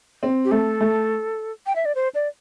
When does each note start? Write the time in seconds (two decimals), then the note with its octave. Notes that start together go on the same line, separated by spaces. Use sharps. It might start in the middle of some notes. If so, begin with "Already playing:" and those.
0.23 C4
0.45 G4
0.51 A3 A4
0.81 A3
1.66 G5
1.76 E5
1.85 D5
1.95 C5
2.15 D5